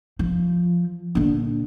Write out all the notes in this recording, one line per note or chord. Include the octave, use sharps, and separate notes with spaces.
F3
A#1 D3